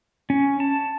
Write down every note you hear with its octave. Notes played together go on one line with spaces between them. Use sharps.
C#4
A5